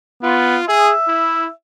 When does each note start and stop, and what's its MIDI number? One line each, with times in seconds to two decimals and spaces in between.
0.23 0.57 59
0.23 0.64 65
0.68 0.92 68
0.68 1.51 76
1.07 1.45 64